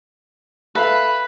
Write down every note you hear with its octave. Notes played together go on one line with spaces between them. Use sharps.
A4 B4 E5 F5 B5